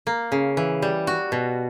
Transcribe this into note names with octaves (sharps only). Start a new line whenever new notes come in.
A#3
C#3
E3
G3
F#4
B2